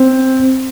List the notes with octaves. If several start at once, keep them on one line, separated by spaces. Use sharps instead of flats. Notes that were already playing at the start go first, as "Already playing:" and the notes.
Already playing: C4